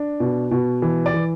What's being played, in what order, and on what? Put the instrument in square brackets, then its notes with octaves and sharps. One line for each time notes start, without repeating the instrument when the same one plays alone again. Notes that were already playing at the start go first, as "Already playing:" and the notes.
Already playing: [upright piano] D4
B2
B2
E3
D5
E3